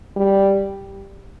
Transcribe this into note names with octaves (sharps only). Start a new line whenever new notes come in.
G3